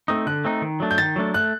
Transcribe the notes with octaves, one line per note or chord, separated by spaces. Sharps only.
A3 C4 D#4 D#6
D3 F#6
A3 C4 D#4
D#3
F#3 A3 D4
G6
D#3 A6
F#3 A3 D4
A3 F#6